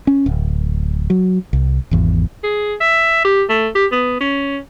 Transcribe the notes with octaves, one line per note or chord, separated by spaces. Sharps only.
C#4
D1
F#3
C2
G#1 E2
G#4
E5
G4
A3
G4
B3
C#4